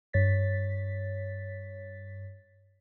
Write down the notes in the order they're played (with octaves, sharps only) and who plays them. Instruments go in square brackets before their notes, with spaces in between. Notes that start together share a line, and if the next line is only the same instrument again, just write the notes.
[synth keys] G2 C#5 A6 B6